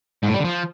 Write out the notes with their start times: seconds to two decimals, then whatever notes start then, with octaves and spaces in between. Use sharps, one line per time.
0.23 G#2
0.28 A2
0.34 G3
0.39 D3
0.45 F3